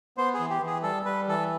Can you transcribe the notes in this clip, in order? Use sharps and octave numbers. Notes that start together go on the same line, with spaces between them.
B3 C5
G#4
E3
G4
E3 G#4
G3 A4
G3 B4
E3 A4